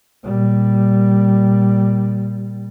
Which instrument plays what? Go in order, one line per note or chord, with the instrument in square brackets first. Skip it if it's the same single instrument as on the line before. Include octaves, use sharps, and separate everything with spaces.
[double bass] A#2 G3